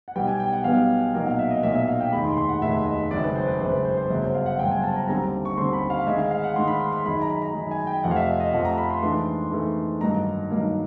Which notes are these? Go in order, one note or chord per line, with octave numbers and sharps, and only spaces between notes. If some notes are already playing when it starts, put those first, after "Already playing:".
F#5
B1 B2 G3 B3 G5
G#5
G5
F#5
B1 B2 G3 B3 F5
B1 A#2 F#3 A#3 D#4 F#5
F5
E5
D#5
B1 A#2 F#3 A#3 D#4 E5
E5
F5
G5
F1 D#2 D#3 G#3 B5
C6
C6
F#5
F1 D#2 D#3 G#3 E5
D#5
G#1 F#2 C#3 D5
B4
C5
B4
G#1 F#2 C#3 C5
B4
C5
C5
G1 F#2 C#3 F#3
C5
F5
F#5
G1 F#2 C#3 F#3 G5
G#5
A5
A#5
D#2 D3 G3 C4 A#5
A#5
C#6
D#2 D3 G3 C4 C6
B5
F5
G#2 D#3 G#3 E5
F5
F5
F#5
G#2 D#3 G#3 C6
B5
C6
C6
F#2 D#3 G#3 B5
A#5
B5
A#5
F#2 D#3 G#3
G#5
G5
F2 C3 F3 A3 F#5
F5
E5
D#5
D#5
F2 C3 F3 A3 F#5
A#5
B5
C6
G#2 E3 A3 D4 C6
G#2 E3 A3 D4
G2 D#3 F#3 A#3 D#4 A#5
G2 D#3 F#3 A#3 D#4